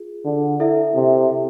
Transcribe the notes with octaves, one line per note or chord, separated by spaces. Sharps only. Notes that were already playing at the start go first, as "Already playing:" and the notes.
Already playing: F4 G#4
D3
E4 A4 E5
C3